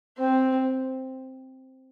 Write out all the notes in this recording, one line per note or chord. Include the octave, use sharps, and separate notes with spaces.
C4